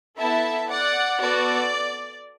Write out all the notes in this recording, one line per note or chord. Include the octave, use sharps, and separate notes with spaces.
B3 E4 A4 E5 A5
D5 F#5
B3 F#4 A4 D5